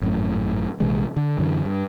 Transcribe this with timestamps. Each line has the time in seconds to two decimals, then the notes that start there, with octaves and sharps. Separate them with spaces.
0.01 G#1 F#2 A2
0.80 A#1 C3 E3 G#3
1.16 D3
1.38 F#2 D3 E3
1.65 G2